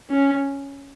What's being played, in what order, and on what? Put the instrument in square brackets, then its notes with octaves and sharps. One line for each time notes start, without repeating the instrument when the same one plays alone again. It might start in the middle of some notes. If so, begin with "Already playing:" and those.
[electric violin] C#4